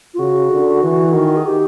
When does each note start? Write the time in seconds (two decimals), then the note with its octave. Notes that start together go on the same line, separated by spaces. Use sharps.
0.14 F4
0.19 C#3 F#4
0.51 D3
0.82 E3
1.13 D#3
1.37 G#4
1.46 G4